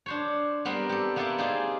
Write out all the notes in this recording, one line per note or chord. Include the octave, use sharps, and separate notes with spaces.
D4 C5 C#5
G3 B3 C4 A#4
G4 A4
A#3 B3 E4 A4 C5 D5
C4 D#4 F4 G4 G#4